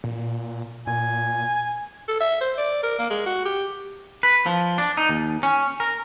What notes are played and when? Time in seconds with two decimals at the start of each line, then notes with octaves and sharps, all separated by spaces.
0.04 A#2
0.87 A#2 G#5
2.08 A4
2.21 E5
2.41 C5
2.58 D5
2.83 A#4
2.99 A#3
3.10 G#3
3.26 F#4
3.45 G4
4.23 B4
4.46 F3
4.78 D4
4.97 D#4
5.09 D#2
5.43 C#4
5.80 A#4